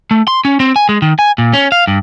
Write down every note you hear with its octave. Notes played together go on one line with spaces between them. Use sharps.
A3
C6
C#4
C4
G#5
G#3
D#3
G#5
A#2
C#4
F5
G2